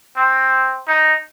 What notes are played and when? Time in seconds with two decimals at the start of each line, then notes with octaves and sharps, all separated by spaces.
0.17 C4
0.87 D#4